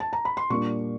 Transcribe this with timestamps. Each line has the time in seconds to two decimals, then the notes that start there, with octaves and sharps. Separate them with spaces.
0.00 A5
0.13 A#5
0.25 B5
0.37 C6
0.50 A#2 G3 A#3 D4 C#6